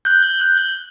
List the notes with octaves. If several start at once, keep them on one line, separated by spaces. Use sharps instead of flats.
F#6 G6